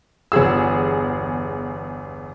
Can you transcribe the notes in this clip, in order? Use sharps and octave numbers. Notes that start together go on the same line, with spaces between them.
G1 E2 G#4 E6